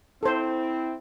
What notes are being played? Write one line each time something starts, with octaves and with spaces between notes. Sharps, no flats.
C4 E4 A4 C5